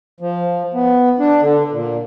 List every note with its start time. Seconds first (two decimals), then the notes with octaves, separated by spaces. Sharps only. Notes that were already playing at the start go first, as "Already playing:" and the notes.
0.20 F3
0.74 B3
1.19 D4
1.42 D3
1.72 A#2